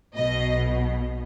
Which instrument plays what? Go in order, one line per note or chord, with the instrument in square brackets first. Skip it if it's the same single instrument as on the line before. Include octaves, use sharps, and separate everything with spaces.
[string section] B1 B2 D#5